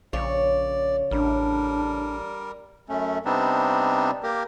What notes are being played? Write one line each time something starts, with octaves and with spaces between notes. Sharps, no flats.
A#1 C#3 C#5 D5
A1 G3 D4 A#4
F#2 A3 C#4
C3 G3 B3 C4 D4 D#4
A#3 G4 A#4